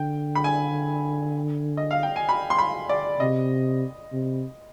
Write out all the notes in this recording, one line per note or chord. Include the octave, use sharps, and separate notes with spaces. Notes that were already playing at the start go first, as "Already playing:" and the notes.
Already playing: D3 G5
B5
G#5
D#5
F5
G5
G#5
B5
C6
B5
D5
C3 D#5
C3